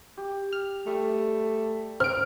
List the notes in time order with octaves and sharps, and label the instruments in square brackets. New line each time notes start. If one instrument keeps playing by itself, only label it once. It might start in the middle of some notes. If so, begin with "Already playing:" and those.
[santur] G4
[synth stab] F6
[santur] G3 [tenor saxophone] A3
[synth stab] C5 D7 [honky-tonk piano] F6